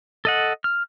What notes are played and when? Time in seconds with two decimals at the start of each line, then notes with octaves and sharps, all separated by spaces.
0.25 A4 D#5 F#5
0.64 F6